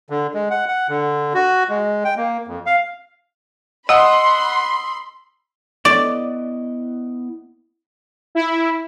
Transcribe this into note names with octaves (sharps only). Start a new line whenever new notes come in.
D3
G#3
F#5
F#5
D3
F#4
G#3
G5
A#3
F2
F5
D#5 F#5 B5 C6 D#6 E6
B3 E4 D5 D#5
E4